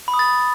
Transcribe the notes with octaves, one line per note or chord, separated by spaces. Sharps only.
B5
D#6
A6